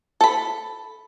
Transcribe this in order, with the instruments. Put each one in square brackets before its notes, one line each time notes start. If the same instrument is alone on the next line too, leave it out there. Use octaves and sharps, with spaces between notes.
[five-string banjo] A4 B5